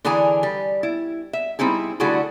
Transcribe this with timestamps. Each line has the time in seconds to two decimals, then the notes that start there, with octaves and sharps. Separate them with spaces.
0.05 D3 E3 D4 G#4 G#5 A#5
0.43 G3
0.83 E4
1.33 E5
1.59 G3 C4 D#4 E4 G#4
2.00 D3 G3 A3 E4 F#4 G#4